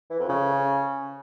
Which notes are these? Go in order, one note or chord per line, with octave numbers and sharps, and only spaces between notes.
E3
F2
C#3